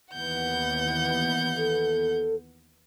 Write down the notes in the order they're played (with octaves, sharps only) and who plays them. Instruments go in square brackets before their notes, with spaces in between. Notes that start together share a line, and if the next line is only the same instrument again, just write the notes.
[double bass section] D#2 E3 B3 [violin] F#5 G6
[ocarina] A4